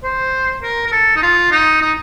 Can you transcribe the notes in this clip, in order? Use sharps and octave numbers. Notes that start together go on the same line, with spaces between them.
C5
A#4
A#4
A4
D#4
F4
D#4
D#4